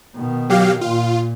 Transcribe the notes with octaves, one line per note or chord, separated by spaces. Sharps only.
B2 D#3
F#3 G4 F5
A#2 F4